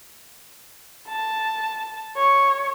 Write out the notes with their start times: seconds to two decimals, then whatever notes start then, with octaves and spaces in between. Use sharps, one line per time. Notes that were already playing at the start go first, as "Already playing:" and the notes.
1.08 A5
2.16 C#5